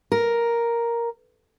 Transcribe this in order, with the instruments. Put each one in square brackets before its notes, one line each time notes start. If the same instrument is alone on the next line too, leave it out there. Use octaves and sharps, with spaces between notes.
[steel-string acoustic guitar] A#4